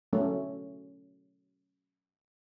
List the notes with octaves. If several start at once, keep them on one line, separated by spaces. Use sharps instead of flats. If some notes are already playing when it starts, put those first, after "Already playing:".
F#3 A3 C#4